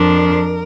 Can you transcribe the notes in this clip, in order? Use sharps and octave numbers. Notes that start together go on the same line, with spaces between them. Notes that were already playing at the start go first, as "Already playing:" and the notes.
Already playing: F2 F3 D4 A#4